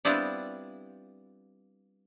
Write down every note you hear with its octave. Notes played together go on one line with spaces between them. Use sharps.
G3 B3 C4 D4 E4 F4